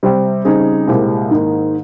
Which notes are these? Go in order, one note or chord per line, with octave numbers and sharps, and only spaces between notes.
C3 G3 C4 G4
C#3 G3 C4 D#4 G#4
C2 A#2 G#3 C4 G4
G#2 D#3 A#3 D#4